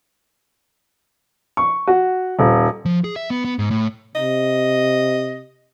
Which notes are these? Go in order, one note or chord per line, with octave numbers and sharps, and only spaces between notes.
C#6
F#4
D#1
F3
G#4
E5
B3
B3
G#2
A2
C3 D#5